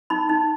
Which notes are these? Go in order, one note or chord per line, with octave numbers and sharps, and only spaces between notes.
D#4 B5
D#4